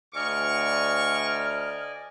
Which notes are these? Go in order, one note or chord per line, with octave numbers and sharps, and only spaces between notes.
D2 D5 D#5 G#5 C#6 F6